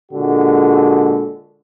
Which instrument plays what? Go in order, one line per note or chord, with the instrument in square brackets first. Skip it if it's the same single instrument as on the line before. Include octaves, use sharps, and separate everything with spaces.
[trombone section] A#2 D3 G#3 F#4